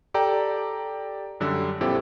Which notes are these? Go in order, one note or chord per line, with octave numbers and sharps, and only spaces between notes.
G4 A4 D5 G5 A#5
F#2 D3 G3 E6
A#1 A#2 C4 E4 G4 A4